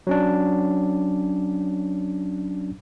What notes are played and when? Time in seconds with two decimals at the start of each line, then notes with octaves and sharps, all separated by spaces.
0.07 F#3 C#4 D4